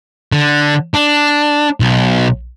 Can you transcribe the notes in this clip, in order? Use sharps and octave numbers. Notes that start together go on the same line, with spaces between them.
D3
D4
B1